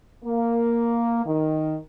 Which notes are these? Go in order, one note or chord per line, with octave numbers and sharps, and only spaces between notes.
A#3
D#3